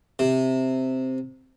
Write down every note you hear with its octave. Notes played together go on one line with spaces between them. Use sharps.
C3